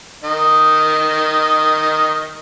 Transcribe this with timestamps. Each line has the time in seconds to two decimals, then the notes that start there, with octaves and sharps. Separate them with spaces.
0.24 D#3 D#5